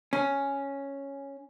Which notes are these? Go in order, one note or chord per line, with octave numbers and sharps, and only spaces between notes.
C#4